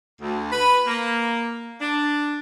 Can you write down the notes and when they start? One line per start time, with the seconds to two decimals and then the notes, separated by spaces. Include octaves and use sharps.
0.21 D2
0.52 B4
0.87 A#3
1.81 D4